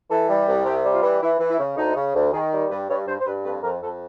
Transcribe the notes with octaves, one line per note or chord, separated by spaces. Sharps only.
E3 A4
G3
C2
C3 G4
G3
F4
E3
E3 E4
E3
E4
C#3
D2 D#4
C#3
D2
D#3 G#4
G3
G2 B4
G2 C#5
G2 C5
C5
G2 B4
F2 B4
F2 A#4
F2 A4